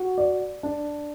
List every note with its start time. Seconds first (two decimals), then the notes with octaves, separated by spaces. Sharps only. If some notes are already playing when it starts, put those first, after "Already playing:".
Already playing: F#4
0.18 D5
0.63 D4